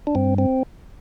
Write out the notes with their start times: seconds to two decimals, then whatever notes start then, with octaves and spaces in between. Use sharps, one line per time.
0.07 D4
0.15 G2 C4
0.38 C4